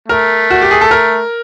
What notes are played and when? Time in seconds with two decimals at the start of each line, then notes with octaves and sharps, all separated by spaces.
0.08 A3 A#4
0.50 F#4
0.62 G4
0.71 G#4
0.81 A4
0.91 A#4